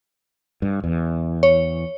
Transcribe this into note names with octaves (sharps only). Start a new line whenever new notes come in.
G2
E2
C#5